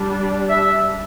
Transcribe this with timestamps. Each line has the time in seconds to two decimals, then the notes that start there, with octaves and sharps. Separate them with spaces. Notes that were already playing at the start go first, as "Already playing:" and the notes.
Already playing: G3 D4
0.50 E5